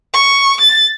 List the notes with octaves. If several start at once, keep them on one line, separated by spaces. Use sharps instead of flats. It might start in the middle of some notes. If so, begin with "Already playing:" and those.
C#6
A6